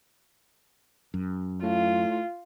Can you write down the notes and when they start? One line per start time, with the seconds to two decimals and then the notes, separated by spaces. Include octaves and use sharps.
1.14 F#2
1.63 A2 F4